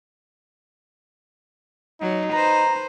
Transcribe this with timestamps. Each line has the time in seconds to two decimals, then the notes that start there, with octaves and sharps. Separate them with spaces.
2.01 F#3 D#4
2.32 B4 C5 A#5